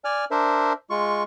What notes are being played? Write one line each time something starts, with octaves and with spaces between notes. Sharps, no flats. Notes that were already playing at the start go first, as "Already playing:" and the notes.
D5 G#5 F6
D4 A#4 C5 E5
G#3 F4 C#6